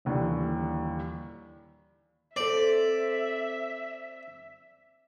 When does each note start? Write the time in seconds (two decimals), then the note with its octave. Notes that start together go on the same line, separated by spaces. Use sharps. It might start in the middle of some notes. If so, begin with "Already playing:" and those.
0.05 D#1 D#2 D3 E3
2.36 C4 A4 D5 E5